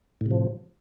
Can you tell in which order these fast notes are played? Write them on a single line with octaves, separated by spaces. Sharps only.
A2 C3 F3